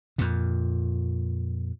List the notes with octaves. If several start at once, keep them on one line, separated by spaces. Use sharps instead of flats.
F2 A#2